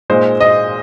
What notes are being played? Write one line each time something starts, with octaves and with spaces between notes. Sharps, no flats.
A#2 G#3 D#4 C5
D#5